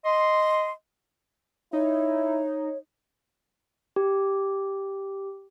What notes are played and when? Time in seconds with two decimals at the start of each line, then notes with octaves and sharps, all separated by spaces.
0.05 D#5 C6
1.73 D#4 E4 C#5
3.96 G4